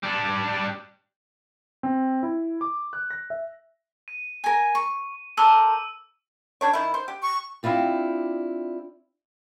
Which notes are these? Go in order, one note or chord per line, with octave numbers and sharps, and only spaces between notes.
G3 D4
C4
E4
D6
F#6
A#6
E5
D#7
A#4 G#5
C#6
A4 A#4 C5 D6 E6 D#7
G3 D4 C#5
D#3 E4
C5
G4
C#6
C4 D4 E4 F4 G4